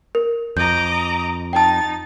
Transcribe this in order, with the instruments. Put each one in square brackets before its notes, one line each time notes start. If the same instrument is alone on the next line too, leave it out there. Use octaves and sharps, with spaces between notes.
[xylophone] A#4
[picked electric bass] F2 [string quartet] D#5 A#5 D6 [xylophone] G6
[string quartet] D#4 A6 [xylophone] G5 A5